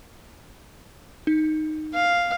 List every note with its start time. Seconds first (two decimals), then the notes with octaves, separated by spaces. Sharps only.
1.27 D#4
1.94 F5